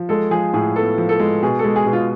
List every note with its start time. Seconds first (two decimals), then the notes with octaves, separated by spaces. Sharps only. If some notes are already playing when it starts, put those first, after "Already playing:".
Already playing: F3
0.09 G#3 A4
0.31 F3 G#4
0.54 A2 G#4
0.76 B3 A4
0.98 F3
1.09 A4
1.20 G#3
1.42 B2 G#4
1.59 A4
1.64 G#3
1.76 G#4
1.86 B2
1.93 F4